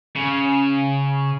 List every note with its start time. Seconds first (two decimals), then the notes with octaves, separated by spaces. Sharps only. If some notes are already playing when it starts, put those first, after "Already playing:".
0.16 C#3